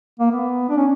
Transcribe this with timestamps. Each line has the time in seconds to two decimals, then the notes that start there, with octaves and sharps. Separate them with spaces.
0.19 A#3
0.31 B3
0.69 D4
0.77 C#4